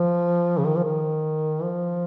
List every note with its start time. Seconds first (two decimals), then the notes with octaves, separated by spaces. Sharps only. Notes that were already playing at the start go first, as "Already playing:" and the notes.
Already playing: F3
0.59 C#3
0.67 D#3
0.76 F3
0.84 D#3
1.62 F3